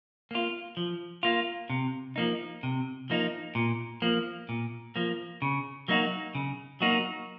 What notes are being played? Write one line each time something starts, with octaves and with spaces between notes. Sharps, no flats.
A#3 F4
F3
A#3 F4
C3
F3 A#3 D#4
C3
F3 A#3 D#4
A#2
F3 A#3
A#2
F3 A#3
C#3
F#3 A#3 D#4 F#4
C#3
F#3 A#3 D#4 F#4